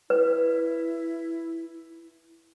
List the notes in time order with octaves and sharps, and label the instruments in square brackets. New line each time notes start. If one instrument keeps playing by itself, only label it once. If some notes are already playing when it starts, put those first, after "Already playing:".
[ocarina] E4 [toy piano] B4